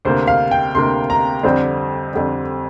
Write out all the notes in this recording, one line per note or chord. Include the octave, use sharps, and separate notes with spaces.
D2 C3 A#3 C5
F5
G5
D2 C3 A#3 C6
A#5
F2 D3 G3 C4 C5
F2 D3 G3 C4